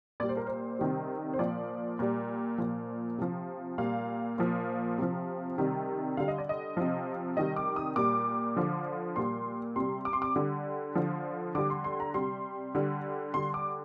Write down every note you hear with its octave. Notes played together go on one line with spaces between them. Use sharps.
A#2 G3 D5
C5
A#4
C5
C3 D#3 G3
C5
A#2 F3 D5
A#2 G3
A#2 F3
C3 F3
A#2 G3 F5
A#2 F3
C3 F3
C3 D#3 G3
D3 G3 F5
D#5
D5
D#5
C3 F3
C3 D#3 G3 D#5
D6
D#6
A#2 G3 D6
D3 F3
A#2 G3 C6
C3 G3 C6
D6
C6
D6
D3 G3
D3 F3
D3 G3 D6
C6
C6
A#5
C3 G3 C6
D3 G3
D3 G3 C6
D6